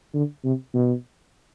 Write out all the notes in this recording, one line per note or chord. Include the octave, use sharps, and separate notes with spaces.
D3
C3
B2